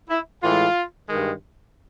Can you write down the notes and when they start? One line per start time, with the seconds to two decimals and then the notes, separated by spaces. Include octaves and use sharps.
0.10 E4
0.43 A2 E3 G#3 F4
1.09 G2 D#3 G#3